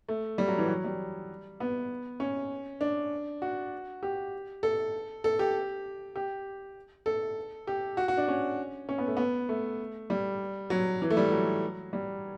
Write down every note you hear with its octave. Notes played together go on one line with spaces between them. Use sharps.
A3
G3
F#3
E3
F#3
G3
B3
C#4
D4
F#4
G4
A4
A4
G4
G4
A4
G4
F#4
F#4
D4
C#4
C#4
B3
A3
B3
A3
G3
F#3
E3
A3
G3
F#3
G3